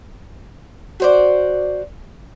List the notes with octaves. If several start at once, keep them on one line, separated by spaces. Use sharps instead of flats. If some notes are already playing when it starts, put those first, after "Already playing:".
F#4 C5 D5